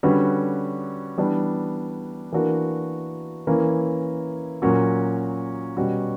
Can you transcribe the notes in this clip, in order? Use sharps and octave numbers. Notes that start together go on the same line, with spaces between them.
D3 G3 C#4 F#4 B4
E3 G3 B3 D4
E3 A#3 D4 F#4 A#4
E3 A#3 C#4
A#2 F#3 C#4 F#4 A#4
B2 G3 C#4 F#4